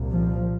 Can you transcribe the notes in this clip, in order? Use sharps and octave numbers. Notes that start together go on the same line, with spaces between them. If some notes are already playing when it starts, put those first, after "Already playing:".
Already playing: C2 A#2
F3